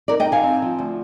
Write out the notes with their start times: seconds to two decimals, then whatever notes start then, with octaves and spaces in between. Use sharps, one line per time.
0.08 D#4 A#4 D5
0.20 D#5 G5
0.26 D#4
0.32 F5 G#5
0.43 C4
0.62 F3
0.79 D2